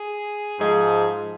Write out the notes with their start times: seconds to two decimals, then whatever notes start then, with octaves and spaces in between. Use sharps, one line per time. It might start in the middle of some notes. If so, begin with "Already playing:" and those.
Already playing: G#4
0.59 G#2 F3 G#3